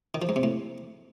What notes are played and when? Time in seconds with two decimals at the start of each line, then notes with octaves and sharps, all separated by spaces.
0.14 D#3
0.22 F3
0.29 G#2
0.36 C3
0.43 A2